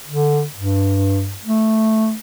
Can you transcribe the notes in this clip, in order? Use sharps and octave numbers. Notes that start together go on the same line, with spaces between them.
D3
G2
A3